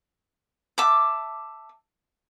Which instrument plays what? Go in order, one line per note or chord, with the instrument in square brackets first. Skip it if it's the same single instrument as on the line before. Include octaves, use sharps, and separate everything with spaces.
[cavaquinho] E5 A5 D6